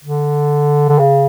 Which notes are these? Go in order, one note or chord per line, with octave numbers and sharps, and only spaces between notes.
D3
D3
C#3